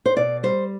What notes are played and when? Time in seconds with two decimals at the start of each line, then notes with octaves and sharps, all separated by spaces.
0.06 C5
0.16 B2 D5
0.43 G3 C5